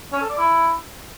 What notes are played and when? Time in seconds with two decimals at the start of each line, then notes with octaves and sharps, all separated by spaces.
0.12 C#4
0.21 A4
0.29 D5
0.38 E4